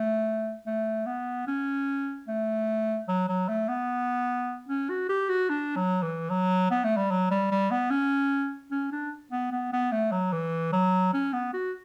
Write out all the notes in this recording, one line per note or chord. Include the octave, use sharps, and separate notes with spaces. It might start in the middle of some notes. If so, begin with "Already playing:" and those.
Already playing: A3
A3
B3
C#4
A3
F#3
F#3
A3
B3
C#4
F#4
G4
F#4
D4
F#3
E3
F#3
B3
A3
G3
F#3
G3
G3
B3
C#4
C#4
D4
B3
B3
B3
A3
F#3
E3
F#3
C#4
B3
F#4